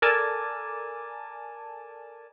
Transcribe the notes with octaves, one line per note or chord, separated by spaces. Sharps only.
A4 A#4 D5 G#5 A5